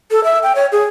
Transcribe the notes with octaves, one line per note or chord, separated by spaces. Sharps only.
A4
E5
G5
C#5
G#4